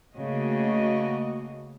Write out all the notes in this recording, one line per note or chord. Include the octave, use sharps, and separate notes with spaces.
C#3 A3 A#3 F#4 D#5